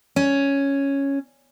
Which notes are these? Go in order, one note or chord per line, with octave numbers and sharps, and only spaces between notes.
C#4